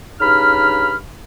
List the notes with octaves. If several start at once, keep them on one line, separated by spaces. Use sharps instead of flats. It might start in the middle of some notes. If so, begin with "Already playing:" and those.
G2 C#3 D#4 B5 F6